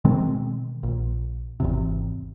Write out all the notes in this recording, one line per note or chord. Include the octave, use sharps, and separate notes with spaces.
B2 D#3 G#3 C4
A#1
G#1 E2 C3